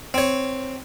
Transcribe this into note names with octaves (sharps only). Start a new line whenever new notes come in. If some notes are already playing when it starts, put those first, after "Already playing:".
C4 C#5